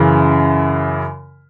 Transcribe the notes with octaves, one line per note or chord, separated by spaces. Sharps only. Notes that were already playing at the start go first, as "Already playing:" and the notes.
Already playing: F#2 C#3 E3